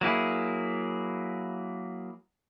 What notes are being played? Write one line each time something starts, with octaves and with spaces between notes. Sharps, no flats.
F#3 A#3 E4 G#4